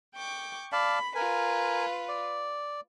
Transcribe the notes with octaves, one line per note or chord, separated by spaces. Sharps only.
G5 C#6 D6
D5 F5 A5 B5
F4 A#4 B4 G#5
D5